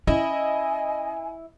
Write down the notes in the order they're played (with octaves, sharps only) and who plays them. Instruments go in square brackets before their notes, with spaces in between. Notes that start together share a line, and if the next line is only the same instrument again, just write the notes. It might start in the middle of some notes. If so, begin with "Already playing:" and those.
[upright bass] C#4 [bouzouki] E4 [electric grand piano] D#5 [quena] G#5